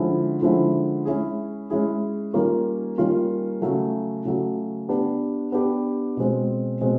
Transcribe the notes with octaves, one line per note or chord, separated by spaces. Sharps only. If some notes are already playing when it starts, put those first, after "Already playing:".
Already playing: D3 F3 G#3 C#4 E4
D3 F3 G#3 C#4 E4
G#3 C#4 E4 G#4
G#3 C#4 E4 G#4
D#3 G3 A#3 C#4 F4
D#3 G3 A#3 C#4 F4
C#3 F#3 A3
C#3 F#3 A3
B3 D4 G4
B3 D4 G4
B2 G#3 C4
B2 G#3 C4